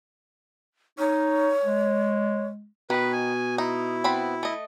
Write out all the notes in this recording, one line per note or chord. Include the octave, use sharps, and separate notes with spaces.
D#4 C#5
G#3
B2 D#3 D#4 B4
G#5
D#4 E4
B3 C4 B5
A3 D#5